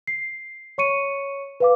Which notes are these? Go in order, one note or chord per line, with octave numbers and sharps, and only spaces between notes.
C7
C#5 C#6 C#7 D#7
B4 F5 D6